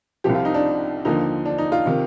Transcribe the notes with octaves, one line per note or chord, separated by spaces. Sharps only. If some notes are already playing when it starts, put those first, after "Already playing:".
C2 C3 F3 G4
F4
D#4
D4
D#2 D3 F3 D#4
D4
D#4
F4
C3 D#3